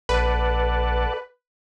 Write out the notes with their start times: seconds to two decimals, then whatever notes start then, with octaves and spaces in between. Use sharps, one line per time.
0.09 A#1 A4 B4 D5 F#5